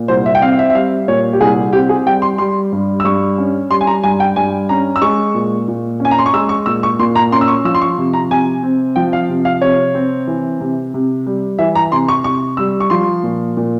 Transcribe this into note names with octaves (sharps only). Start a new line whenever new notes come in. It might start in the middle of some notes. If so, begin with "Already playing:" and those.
Already playing: A#2
C2 C5
E5
G5
C4 F5
F5
E5
E5
G3 F5
A#2 C#5
G4
C2 G#4
C4 G4
G#4
G3 G5
C6
G3 C6
G2
E6
G2 C#6
C#4
G3 C6
G#5
A#5
G2 G#5
G5
G2 G#5
C#4 A#5
E6
G#3 C#6
A#2
A#2
C#4 G#5
A#5
C6
C#6
G#3 E6
C#6
A#2 E6
C#6
A#2 C6
A#5
C#4 C6
E6
C#6
F3 E6
C6
C#6
C3
A#5
C3 G#5
C4
F3 G5
F5
C3
F5
C3 C#5
C4
E3
C3
C3
G3
E3 E5
A#5
C3 C6
C#6
C3 C#6
G3 E6
C#6
F3 C6
A#2
A#2